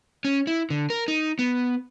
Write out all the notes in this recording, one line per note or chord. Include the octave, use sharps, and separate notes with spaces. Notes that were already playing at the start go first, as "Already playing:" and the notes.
C#4
E4
D3
A#4
D#4
B3